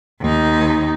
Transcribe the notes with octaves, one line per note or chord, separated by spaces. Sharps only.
D#2 D#4